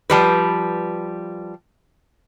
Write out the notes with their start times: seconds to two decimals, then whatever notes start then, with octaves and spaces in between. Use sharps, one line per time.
0.10 F3 G3 B4